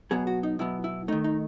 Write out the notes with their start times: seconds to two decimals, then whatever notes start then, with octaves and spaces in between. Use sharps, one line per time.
0.11 B2 F#3 B3 G#4
0.27 F#4
0.43 D#4
0.59 B2 F#3 B3 E4
0.84 E4
1.08 D#3 A3 D#4
1.24 D#4